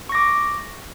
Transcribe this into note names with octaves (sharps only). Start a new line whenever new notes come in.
C#6 D6 A#6